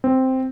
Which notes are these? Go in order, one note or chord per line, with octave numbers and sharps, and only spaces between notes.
C4